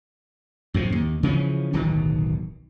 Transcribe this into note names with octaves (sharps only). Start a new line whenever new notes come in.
F#2 A2 C3
D#2
C#3 E3 F3 C#4
D1 B1 B2 D#3